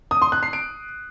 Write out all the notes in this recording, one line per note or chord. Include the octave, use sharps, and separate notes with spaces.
D#6
C6
F#6
C7
D7